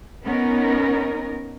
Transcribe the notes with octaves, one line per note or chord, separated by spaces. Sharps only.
B3 C#4 D#4 A#4